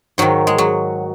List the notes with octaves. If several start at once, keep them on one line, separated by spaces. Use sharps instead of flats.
G#2 D#3 F#3
G#3
F#3